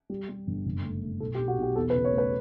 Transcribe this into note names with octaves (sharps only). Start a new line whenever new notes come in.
G3
G3
G1
F#1
A3
A3
B1 A4
G4
B1
F#4
B1 G4
E2 A4
B4
C#3
C#5
A3
B4